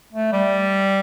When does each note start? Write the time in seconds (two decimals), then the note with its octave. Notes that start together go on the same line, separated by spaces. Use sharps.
0.13 A3
0.32 G3